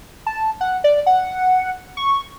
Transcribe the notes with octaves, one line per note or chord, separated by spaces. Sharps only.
A5
F#5
D5
F#5
C#6